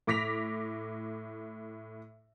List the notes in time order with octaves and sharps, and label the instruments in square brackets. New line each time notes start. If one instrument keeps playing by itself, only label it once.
[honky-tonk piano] A2 D6 A#6 B6 F7